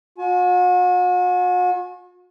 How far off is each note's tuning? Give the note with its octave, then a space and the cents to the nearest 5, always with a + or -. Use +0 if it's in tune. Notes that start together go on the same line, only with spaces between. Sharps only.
F#4 -40 G#5 +40